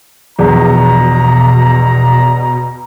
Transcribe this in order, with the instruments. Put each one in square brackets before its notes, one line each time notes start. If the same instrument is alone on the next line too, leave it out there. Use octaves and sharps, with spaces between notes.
[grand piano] A#1 E2 [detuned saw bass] B2 [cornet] A#5